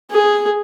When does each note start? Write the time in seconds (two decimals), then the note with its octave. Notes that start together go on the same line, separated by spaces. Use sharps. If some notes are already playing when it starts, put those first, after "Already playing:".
0.11 G#4